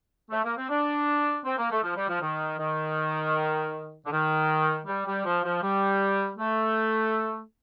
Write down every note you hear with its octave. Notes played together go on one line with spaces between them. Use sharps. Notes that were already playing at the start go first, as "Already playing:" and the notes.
A3
A#3
C4
D4
C4
A#3
A3
F3
G3
F3
D#3
D#3
D3
D#3
G3
G3
F3
F3
G3
A3